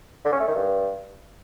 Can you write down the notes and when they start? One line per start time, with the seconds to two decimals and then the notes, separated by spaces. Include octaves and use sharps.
0.25 D3
0.32 C#4
0.40 A3
0.48 D#3
0.55 G2